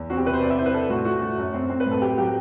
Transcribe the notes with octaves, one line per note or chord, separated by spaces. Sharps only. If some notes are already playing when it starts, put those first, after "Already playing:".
Already playing: E2
C4 F#4
G4
C3 B4
C5
C4 D5
E5
E4 C5
B4
D4 A4
A2 F#4
A3 F#4
A3
F#2
C4
C4
B4
A2
A4
F#3 G4
F#3 G4